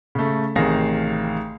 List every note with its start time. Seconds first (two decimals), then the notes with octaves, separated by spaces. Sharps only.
0.15 C#3 A3
0.56 A1 C3 D#3 G#4 F5 A#6